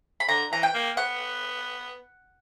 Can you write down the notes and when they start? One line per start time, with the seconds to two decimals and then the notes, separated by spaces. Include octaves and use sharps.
0.20 B5
0.29 D3 A#5
0.52 E3 A#5
0.63 G5
0.74 A#3
0.97 B3 F#5